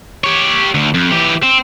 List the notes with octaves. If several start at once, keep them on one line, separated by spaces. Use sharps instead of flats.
G4 C#5
D2
F2
E3 G4
C4